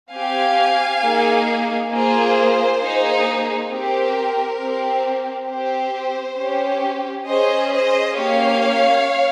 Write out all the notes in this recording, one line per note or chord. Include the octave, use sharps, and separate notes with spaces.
C4 G4 F5 G#5
A#3 D#4 G#4
A#3 F4 G#4 C5
A#3 D#4 G#4
C4 G4 A#4
C4 G4
C4 G4 C5
C#4 G4
C#4 G#4 C5 D#5
C5 D#5
A#3 C#4 G4 C#5 F5